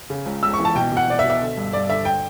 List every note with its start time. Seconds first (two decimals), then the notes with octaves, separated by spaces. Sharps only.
0.10 C#3
0.26 C#2
0.43 C#2 E6
0.53 C#6
0.59 E3
0.65 A5
0.75 B2 G5
0.92 B2 F#5
1.08 B2 D5
1.19 E5
1.24 B2
1.30 E5
1.41 D3
1.57 G2
1.73 G2 D5
1.89 D3 E5
2.05 G5